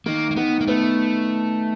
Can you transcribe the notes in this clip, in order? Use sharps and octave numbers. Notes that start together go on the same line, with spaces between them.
D#3 A#3
A#3
D#3 B3
A#3
A3 B3